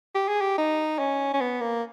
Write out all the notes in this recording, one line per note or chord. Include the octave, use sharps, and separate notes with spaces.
G4
G#4
G4
D#4
C#4
C#4
B3
A#3